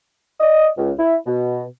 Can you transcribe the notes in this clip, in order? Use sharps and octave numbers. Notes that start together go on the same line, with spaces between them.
D5 D#5
C#2
E4
B2